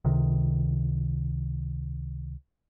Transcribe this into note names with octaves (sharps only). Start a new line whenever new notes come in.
C#2 C3 D#3